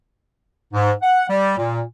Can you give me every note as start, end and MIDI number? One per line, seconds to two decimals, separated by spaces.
0.73 0.91 44
1.02 1.23 78
1.29 1.56 55
1.57 1.81 46